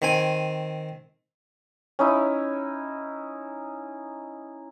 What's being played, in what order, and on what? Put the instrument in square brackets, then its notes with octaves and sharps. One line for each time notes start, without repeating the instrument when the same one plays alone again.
[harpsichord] D#3 C4 G#5
[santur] C#4 D#4 E4